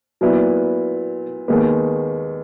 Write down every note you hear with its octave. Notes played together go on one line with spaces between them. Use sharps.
A#2 F#3 B3 E4
D#2 D#3 G#3 B3